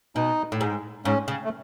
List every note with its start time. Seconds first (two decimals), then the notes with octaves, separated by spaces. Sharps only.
0.16 B2 D#4
0.52 A2
0.61 G#2
1.05 G#2 C#4
1.28 C#3
1.44 A3